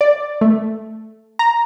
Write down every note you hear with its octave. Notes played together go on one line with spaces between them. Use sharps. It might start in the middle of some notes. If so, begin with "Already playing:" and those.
D5
A3
A#5